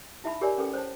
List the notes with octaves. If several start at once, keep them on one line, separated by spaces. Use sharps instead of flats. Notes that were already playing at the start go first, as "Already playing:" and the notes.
D#4 E4 E5 A5 B5
G4 G#4 A#4 C#5 D5 G#5
C#4 G#4 A4 B4 G5
C5 C#5 A5